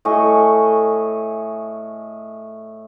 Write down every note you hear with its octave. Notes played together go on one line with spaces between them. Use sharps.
A2 D#5 G#5 C#6